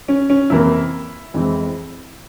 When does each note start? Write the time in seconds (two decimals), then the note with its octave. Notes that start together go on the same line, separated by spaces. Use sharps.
0.08 C#4
0.30 C#4
0.50 F2 C3 E3 A#3 E4
1.34 F2 E3 G#3 C4